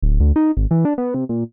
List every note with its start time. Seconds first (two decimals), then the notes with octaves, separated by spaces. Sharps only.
0.02 D1
0.20 D2
0.36 D#4
0.57 G#1
0.71 E3
0.85 D4
0.98 B3
1.14 C3
1.29 A#2